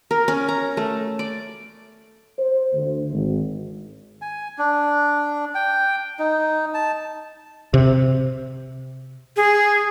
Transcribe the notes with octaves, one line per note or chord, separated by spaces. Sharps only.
A#4
C#4
A#5
A3
D5
C5
D2
G#1
G#5
D4
G5
D#4
A5
C3
G#4